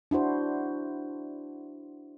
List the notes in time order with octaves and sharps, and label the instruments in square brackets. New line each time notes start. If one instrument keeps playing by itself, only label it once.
[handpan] D4 E4 F#4 C5